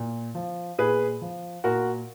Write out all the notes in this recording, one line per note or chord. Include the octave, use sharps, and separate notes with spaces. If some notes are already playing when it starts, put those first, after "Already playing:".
Already playing: A#2
F3
A#2 G#4 B4
F3
A#2 F#4 A#4